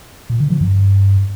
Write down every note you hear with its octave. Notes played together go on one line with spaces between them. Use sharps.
A#2
D3
F3
G2